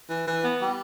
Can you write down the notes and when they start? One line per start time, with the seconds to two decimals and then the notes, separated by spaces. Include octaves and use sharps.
0.08 E3
0.25 E3
0.42 B3
0.58 G3